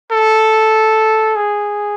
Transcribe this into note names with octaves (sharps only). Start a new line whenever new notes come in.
A4
G#4